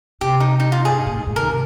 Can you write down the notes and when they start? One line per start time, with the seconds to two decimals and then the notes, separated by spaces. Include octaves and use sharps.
0.21 C3 G4
0.40 D#4
0.60 D#4
0.72 F4
0.85 G2 G#4
0.98 G#2
1.07 A#2
1.17 G#2
1.27 G#2
1.36 D#3 A#4
1.48 C3